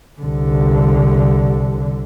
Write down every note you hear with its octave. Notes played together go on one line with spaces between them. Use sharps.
C2 D3